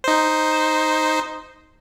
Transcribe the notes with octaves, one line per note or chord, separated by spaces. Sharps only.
D#4 C5